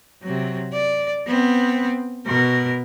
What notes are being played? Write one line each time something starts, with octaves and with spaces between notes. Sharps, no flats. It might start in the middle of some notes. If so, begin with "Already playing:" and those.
C3 F#3
D5
B3 C4
B2 A#4